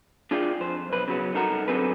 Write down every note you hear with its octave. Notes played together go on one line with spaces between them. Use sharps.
D4 F4 G#4 D5 F5 G5
F2 C5
B1 B4
C#3 F#3 B3
C2 D#4 A4 A#4 F#5 A#5
D3 F#3 C4 G#4 A4 B4